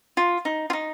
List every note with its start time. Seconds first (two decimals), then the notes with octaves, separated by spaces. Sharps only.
0.17 F4
0.45 D#4
0.70 F4
0.73 D#4